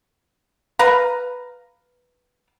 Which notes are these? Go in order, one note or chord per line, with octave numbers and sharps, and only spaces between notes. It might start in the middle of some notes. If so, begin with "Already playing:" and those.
B4 F5 A#5